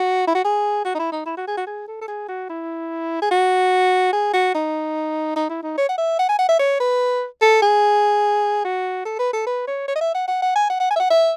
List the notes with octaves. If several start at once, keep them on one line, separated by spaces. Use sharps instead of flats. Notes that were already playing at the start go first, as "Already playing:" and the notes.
Already playing: F#4
E4
F#4
G#4
F#4
D#4
E4
D#4
E4
F#4
G#4
F#4
G#4
A4
A4
G#4
F#4
E4
G#4
F#4
G#4
F#4
D#4
D#4
E4
D#4
C#5
F#5
E5
F#5
G#5
F#5
E5
C#5
B4
A4
G#4
F#4
A4
B4
A4
B4
C#5
C#5
D#5
E5
F#5
F#5
F#5
G#5
F#5
F#5
G#5
E5
F#5
E5